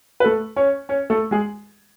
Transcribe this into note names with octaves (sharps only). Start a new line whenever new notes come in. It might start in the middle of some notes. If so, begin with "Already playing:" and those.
B4
A3 A4
C#4 C#5
C#4 C#5
A3 A4
G#3 G#4